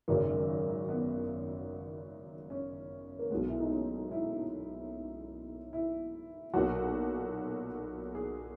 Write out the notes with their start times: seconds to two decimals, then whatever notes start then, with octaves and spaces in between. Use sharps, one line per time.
0.08 G#1 F#2 C#3 F#3 A#3
0.89 B3
2.50 C#4
3.19 A#3
3.30 B1 A#2 G#3 B3
3.48 E4
3.60 D#4
3.70 C#4
4.11 E4
5.73 E4
6.54 B1 A#2 F#3 F#4
8.15 G#4